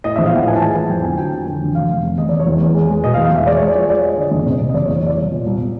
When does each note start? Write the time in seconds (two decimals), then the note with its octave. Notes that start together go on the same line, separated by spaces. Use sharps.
0.04 A2 D#5
0.16 E5
0.18 A#1
0.26 F5
0.34 A2 F#5
0.47 E3 G#5
0.55 A5
0.61 G#3 G#5
0.76 E3 A5
0.89 F2 G5
1.04 D3 G#5
1.18 F#3 G5
1.33 D3
1.47 D3
1.61 F1
1.75 F1 F5
1.89 F1
2.03 F1
2.18 F1 D#5
2.29 D5
2.32 F1
2.39 C#5
2.47 E2
2.61 E2
2.75 G#3
2.89 G#3
3.04 B2 D#5
3.14 F5
3.17 E2
3.25 F5
3.32 E2 E5
3.46 G#3 D5
3.57 C#5
3.61 G#3
3.68 D5
3.75 F3 C#5
3.89 G#3 D5
4.03 G#3 D#5
4.17 D3 D5
4.31 F#1 D#5
4.46 C3
4.60 C3
4.69 D#5
4.74 F#1 D5
4.85 C#5
4.88 E2
4.96 C#5
5.03 E2 D5
5.18 C2
5.31 A#2
5.46 C2